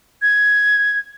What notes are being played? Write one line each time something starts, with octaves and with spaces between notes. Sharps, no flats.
G#6